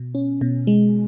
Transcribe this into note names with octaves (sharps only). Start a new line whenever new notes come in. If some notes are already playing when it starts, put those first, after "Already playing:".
Already playing: B2
C#4
B2
G#3